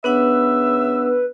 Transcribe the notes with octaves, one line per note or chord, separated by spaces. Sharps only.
C#3 B3 D4 B4 E5 F#5 E6